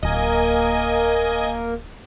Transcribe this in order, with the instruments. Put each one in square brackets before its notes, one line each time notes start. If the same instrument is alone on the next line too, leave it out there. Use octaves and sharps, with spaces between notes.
[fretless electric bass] D1 [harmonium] A#3 A#4 [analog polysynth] D#5 G#5